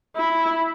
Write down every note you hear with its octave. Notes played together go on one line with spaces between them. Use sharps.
E4